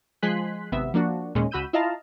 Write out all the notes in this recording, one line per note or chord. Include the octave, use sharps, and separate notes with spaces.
F3 G#3 G#5 C6 F#6 B6
G#1 C3 B3 E5
F3 A#3 D4 F#4
D#2 A#2 G#3 C#4
C#2 F#4 B5 E6 G6 D#7
E4 F4 D#5 F5 A5 A#5